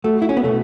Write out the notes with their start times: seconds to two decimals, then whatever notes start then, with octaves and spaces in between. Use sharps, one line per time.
0.04 A3 F#4
0.22 E4
0.29 C#4
0.37 B3
0.43 B2 A3